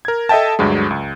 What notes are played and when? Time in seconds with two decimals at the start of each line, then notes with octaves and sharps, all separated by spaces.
0.05 A#4 G#6
0.29 A4 D#5 E5 G5 A5
0.59 D2 G2 F#3 G#3
0.91 C#2